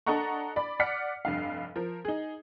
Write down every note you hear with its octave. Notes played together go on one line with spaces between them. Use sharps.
D4 A4 D#5 F#5 A#5 C#6
D5 B5
D5 F#5 F6 B6 C#7
F1 G2 F5
F3 A#4
D#4 G#4